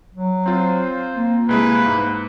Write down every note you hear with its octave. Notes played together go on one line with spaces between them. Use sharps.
F#3
C4 F4 C5
A#3
C2 G#3 E4 B4
G#2